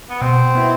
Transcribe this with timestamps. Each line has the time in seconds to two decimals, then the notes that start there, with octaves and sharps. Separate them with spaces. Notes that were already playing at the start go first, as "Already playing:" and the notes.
0.10 B3
0.21 B2 C4
0.55 B3 E4